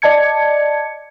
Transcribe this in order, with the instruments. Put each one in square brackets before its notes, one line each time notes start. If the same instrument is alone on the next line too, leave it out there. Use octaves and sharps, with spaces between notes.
[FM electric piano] D5 D#5 A5 G#6 C#7